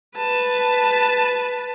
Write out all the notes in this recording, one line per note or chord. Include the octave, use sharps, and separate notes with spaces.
B4 A5